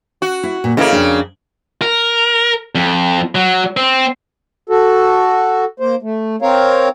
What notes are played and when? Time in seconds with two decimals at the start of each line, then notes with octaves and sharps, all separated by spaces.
0.22 F#4
0.43 E4
0.64 A#2
0.77 C#3 A#3 E4 A4 D#5
0.92 F2 D4
1.82 A#4
2.75 F2
3.35 F#3
3.77 C4
4.70 F#4 A4
5.80 A#3 C5
6.02 A3
6.42 C4 A#4 C#5 F5